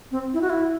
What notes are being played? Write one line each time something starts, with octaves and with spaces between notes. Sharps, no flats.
C4
E4
F#4
E4